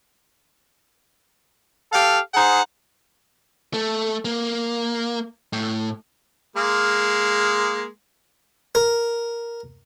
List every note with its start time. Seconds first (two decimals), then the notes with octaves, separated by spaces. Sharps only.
1.92 G4 A4 F5
2.34 D#4 G#4 C5 F#5
3.74 A3
4.25 A#3
5.53 A2
6.56 G#3 A#3
8.75 A#4